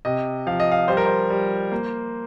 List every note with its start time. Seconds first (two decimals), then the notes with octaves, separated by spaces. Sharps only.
0.05 C3 D#5
0.47 F3 F5
0.60 D#5
0.71 F5
0.88 G3 C5
0.97 A#4
1.06 C5
1.30 G3
1.72 A#3